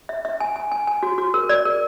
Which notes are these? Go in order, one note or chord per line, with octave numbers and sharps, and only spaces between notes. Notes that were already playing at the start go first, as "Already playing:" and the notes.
E5
E5
G#5
G#5
G#5
G#5
F#4
F#4
A#4
D5
A#4